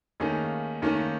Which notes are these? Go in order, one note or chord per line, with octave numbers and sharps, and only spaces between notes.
D#2 D#3 A3 C#4 G#4
D#2 D#3 A3 C#4